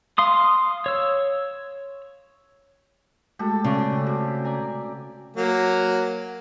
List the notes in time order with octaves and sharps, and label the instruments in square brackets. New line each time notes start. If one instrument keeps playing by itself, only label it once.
[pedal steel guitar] F5 C6 D#6
C#5 E6
[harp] G#3 A3 F#4 [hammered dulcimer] G4 A4
[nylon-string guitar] C#3 [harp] D5 C#6
[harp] C4 F#4 [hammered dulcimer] G4
[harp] D5 G#5 A#5
[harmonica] F#3 A#3